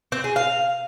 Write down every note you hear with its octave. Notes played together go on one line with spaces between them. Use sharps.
C4
G#4
F5